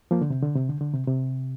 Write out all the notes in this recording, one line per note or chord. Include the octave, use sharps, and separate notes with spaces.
F3 A#3
D3
C3
D3
C3
D3
D3
C3
C3